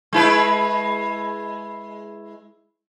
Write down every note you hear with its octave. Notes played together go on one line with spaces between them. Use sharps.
G#3 E4 B4